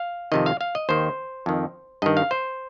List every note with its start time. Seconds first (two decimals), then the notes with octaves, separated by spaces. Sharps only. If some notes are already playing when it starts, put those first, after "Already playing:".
Already playing: F5
0.32 F2 C3 D#3 D#5
0.46 F5
0.61 F5
0.75 D#5
0.89 D#2 D#3 C5
1.46 F2 D#3
2.02 G2 D#3 D#5
2.17 F5
2.31 C5